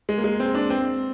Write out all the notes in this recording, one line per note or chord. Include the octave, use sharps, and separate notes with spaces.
G#3
A#3
G#3
C4
D4
C4